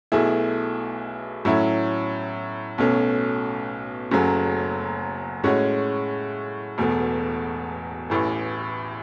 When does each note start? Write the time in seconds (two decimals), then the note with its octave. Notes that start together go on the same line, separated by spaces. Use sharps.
0.12 B1 B2 A3 E4 G#4
1.45 A2 F#3 C#4 E4
2.78 B1 B2 A3 C#4
4.11 F#1 F#2 C#3 F#3 A3
5.44 A2 G#3 C#4 F#4 C#5
6.78 E1 E2 B2 A3
8.10 A1 A2 E3